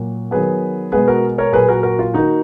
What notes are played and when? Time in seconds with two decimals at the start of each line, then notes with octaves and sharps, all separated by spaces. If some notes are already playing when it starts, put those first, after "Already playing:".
Already playing: A#2 F#3 A#3 F#4
0.31 D#3 F#3 B3 G#4 B4
0.92 B2 G#3 B3 G#4 B4
1.07 F#4 A#4
1.38 A#4 C#5
1.53 A#2 F#3 A#3 G#4 B4
1.68 F#4 A#4
1.83 F#4 A#4
1.99 F4
2.14 D#3 A#3 D#4 F#4